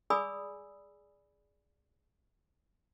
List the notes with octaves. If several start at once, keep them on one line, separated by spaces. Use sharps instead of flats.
G#4 D5 G#5 B5 D#6 E6